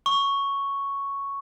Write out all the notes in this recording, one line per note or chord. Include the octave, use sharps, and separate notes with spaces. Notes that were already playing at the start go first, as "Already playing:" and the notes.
C#6